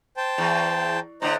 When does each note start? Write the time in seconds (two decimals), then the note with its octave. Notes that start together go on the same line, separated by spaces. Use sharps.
0.17 C5 G5 A5
0.38 E2
1.22 A2 D3 C5 D#5 A#5